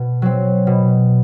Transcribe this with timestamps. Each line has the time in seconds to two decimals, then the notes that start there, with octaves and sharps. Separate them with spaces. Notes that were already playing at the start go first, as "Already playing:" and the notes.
Already playing: B2
0.22 F#3 C4
0.67 B2